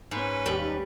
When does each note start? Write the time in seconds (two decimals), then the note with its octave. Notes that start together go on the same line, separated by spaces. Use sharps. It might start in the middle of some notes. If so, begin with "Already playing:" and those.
0.11 G#2 C#4 B4
0.46 D#2 G3 B5